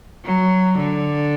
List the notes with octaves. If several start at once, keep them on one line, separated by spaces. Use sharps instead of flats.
F#3
D3